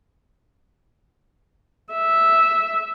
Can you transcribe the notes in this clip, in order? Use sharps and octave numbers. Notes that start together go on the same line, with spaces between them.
E5